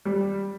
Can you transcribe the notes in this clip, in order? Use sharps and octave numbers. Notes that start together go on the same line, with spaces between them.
G3